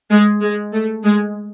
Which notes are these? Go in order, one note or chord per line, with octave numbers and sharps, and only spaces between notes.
G#3
G#3
A3
G#3